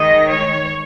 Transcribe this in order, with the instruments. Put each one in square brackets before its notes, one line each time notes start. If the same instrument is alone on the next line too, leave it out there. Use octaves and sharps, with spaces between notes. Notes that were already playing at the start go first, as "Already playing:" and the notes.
Already playing: [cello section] D#3 G#3 D#5
C#5